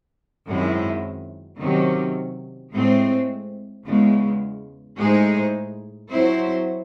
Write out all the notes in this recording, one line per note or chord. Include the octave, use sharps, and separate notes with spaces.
F#2 D#3 G#3 C4 E4
C3 D#3 F#3 C#4
A2 G#3 C4
E2 C#3 G#3
A2 G#3 D#4 G#4 C5
F#3 C4 E4 C5